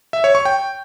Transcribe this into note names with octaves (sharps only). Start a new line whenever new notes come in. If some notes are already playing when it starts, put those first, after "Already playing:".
E5
C#5
C#6
G5